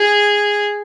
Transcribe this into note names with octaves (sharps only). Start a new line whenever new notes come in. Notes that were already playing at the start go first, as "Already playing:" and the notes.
Already playing: G#4